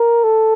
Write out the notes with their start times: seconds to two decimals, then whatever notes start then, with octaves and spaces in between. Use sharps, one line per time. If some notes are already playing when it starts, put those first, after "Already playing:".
Already playing: A#4
0.24 A4